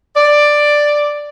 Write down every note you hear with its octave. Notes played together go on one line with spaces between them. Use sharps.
D5